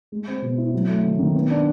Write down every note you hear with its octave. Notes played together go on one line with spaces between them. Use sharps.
G#3
C4
B2
E4
F#3
A3
D#3
D#3
B3
D4